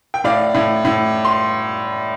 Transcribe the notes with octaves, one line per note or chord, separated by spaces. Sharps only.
G5
A2 D5 F5
A2
A2
C6